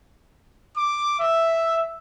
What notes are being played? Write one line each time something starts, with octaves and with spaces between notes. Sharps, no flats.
D6
E5